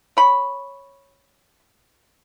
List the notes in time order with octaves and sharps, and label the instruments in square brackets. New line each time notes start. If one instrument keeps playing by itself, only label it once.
[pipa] C#5 B5